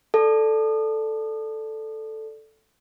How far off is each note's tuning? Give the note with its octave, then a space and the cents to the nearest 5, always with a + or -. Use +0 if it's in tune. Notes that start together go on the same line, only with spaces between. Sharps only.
A4 +0 D5 +0